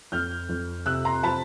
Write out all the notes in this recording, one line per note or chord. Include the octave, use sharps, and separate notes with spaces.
F2 F6 G6
F2
C3 E6 F#6
A#5 C6
F3 A5 B5